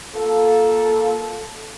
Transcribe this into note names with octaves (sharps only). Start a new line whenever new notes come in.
A#3 F4 A4